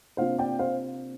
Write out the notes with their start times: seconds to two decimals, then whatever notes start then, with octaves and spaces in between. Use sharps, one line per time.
0.17 C3 A#3 D4 F4 C5 F5
0.38 D5 G5
0.59 C5 F5